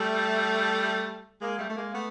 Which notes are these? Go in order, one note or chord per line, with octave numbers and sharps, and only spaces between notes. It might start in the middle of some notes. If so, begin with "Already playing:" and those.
Already playing: G3 A3
G#3 A#3
G3 A3
A3
G#3 A#3
A3 B3